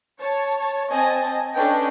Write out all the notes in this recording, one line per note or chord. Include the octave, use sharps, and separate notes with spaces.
C#5 A5
C4 D#5 G#5 A5
C#4 D4 A4 B4 D#5 G5